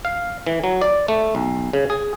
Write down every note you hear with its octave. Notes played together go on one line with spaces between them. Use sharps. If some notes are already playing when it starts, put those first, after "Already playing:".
F5
E3
F#3
D5
A3
B1
C#3
G#4